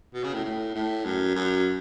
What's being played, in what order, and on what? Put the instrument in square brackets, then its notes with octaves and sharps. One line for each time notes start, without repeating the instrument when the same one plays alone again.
[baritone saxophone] B2
C#3
A2
A2
A2
F#2
F#2